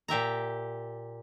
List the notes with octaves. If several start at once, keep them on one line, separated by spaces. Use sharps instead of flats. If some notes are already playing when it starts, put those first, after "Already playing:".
A#2 G4 E5 A#5